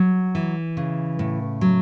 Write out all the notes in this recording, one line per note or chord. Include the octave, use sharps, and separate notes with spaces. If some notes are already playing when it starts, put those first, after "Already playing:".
Already playing: F#3
E3
C#3
A2
F#3